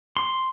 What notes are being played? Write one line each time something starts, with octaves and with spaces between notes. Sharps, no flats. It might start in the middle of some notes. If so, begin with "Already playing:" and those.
C6